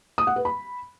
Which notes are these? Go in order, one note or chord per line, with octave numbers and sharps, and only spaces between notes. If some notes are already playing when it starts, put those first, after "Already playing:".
D#6
F#5
B4
B5